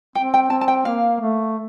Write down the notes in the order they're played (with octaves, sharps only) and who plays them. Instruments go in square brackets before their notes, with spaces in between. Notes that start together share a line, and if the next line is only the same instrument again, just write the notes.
[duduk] C4 [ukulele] G5
[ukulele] G5
[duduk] C4 [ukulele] A5
[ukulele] A5
G5
[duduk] A#3 [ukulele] F5
[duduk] A3